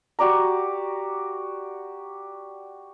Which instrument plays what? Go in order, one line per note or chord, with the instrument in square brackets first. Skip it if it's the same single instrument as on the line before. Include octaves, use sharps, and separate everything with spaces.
[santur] F#4 G4 D5 A#5